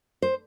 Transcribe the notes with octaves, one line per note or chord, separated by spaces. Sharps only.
C5